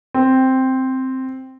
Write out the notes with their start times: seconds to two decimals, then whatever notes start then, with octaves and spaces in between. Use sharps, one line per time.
0.14 C4